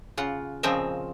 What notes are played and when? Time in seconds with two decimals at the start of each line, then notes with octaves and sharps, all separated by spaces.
0.17 C#3 F4 F#5
0.63 A#2 C#3 F3 C4 D#5 E5